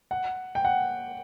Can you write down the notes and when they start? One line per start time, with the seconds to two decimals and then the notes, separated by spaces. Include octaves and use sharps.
0.11 F#5
0.55 G5
0.65 F#5